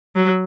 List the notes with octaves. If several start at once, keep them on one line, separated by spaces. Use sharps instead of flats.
F#3